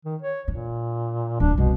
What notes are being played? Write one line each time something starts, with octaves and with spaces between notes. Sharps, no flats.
D#3
C#5
A#2 D4
D1 D4
C2 F#2 B2